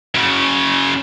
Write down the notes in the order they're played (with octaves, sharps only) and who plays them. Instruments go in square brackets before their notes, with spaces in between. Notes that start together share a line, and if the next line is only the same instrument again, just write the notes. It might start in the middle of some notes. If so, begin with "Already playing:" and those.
[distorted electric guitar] F#2 C#3